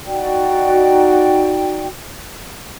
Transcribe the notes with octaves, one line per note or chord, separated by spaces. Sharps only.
D#4 F#4 D5 G5